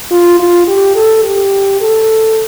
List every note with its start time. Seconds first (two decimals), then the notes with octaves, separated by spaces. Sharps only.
0.11 F4
0.39 F4
0.67 G4
0.95 A4
1.24 G4
1.81 A4